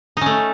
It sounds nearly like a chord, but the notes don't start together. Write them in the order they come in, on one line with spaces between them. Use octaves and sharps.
D#4 C#4 A3